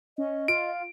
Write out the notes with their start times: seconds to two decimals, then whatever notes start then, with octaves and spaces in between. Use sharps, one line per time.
0.18 C#4 D#5
0.48 F4 D7